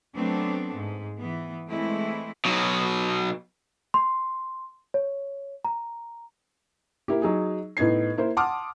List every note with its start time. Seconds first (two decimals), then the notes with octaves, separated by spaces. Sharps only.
0.15 F#3 A3 B3 C4 D4 A4
0.75 G#2
1.18 E3 B3
1.68 E3 G#3 A3 C4 E4
2.45 B2 F#3
3.94 C6
4.94 C#5
5.65 A#5
7.08 A#3 E4 G4
7.22 F#3 D#4 G#4
7.77 A2 B3 D#4 G#6 C7
8.17 A#3 E4 C5
8.37 F#5 A5 C6 D6 D#6 F6